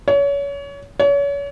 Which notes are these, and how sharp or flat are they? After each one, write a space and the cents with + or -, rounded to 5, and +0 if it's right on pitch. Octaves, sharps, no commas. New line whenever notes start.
C#5 +30
C#5 +35